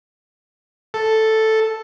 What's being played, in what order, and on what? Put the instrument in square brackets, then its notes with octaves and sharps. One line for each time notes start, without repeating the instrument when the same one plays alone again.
[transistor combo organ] A4